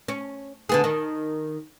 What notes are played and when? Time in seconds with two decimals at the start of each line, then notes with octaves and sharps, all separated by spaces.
0.08 C#4
0.69 D3 B3 G#4
0.84 D#3